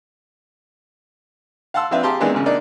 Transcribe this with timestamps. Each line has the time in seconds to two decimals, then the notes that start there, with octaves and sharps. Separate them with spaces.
1.74 F5 F#5 A5 C6 E6
1.91 F3 C4 D4 B4 E5 F5
2.03 G4 G#4 F5 A5 A#5 C6
2.20 D#3 E3 G#3 B3 C4 D4
2.34 G#1 C#3
2.46 A#3 D4 D#4 D5